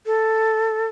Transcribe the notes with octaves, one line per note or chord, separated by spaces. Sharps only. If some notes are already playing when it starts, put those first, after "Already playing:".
A4